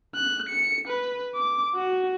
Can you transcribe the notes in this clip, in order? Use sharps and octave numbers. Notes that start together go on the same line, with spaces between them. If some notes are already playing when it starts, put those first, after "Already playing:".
F#6
C#7
B4
D6
F#4